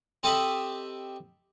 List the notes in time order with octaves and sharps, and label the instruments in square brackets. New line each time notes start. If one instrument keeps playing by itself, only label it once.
[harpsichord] C4 G4 A4 D#5 E5 B5